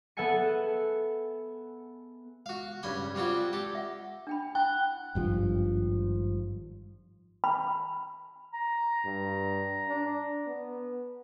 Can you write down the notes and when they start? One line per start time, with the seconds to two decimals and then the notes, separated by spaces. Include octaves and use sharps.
0.17 B3 A4 E5 F#5 G#5 C#7
2.46 F#4 F5
2.83 G2 C#3 G#5 B5 C6
3.15 G3 C4 F4 F#4 G#4
3.53 G4 A4
3.75 E5 F#5
4.27 D4 G5 B5
4.55 E4 F#5 G5
5.15 G#1 G2 F3
7.44 B5
8.53 A#5
9.05 G2
9.89 D4
10.47 B3